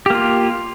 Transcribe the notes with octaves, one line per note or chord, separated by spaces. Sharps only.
A#3 F4 G4